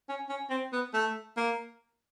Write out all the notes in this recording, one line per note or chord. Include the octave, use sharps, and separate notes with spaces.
C#4
C#4
C4
B3
A3
A#3